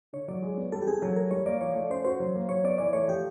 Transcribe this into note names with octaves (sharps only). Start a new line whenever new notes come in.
D3 C#5
F#3 D5
G#3
B3
G3 A4
G4
C4 G#4
F#3 A4
A3 A#4
G3 C#5
A#3 D5
F3 C#5
A3
C#4 C5
F#4 C5
F#3
A#3
F#3 C#5
B3 D5
E3 D5
A3 C#5
F3 G4